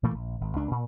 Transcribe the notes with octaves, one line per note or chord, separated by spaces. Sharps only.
A#2 E3 A3 A#3
A#1
G#1
C#2 D4
A#2